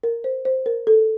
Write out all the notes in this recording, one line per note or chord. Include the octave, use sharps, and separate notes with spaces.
A#4
C5
C5
A#4
A4